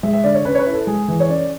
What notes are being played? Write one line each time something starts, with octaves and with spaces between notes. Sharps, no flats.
G#3 E5
E5
D3 D5
C#5
C#4 B4
C#5
B4
E4
A4
G#3 G#4
E3
C#5
C#4 D5